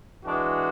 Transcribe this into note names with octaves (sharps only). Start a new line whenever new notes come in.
E3 G#3 D4 F#4